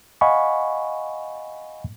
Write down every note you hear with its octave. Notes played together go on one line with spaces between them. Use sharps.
D#5 F5 F#5 G#5 B5 C#6